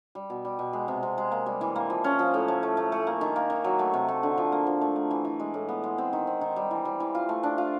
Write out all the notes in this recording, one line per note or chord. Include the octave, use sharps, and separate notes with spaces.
G3
B2
G3
B2
G#3
C3
C3
G#3
A#3
G3
E3
A#3
F3
C#4
F3
A2
A3
A3
A3
A3
A#3
D#3
A#3
D#3
F#3
A3
C3
A3
D3
F3
A#3
F3
A3
A3
E3
E3
G#3
A2
B3
G#3
C4
D#3
C4
D#3
G3
E3
G3
E3
F4
A3
D4
F4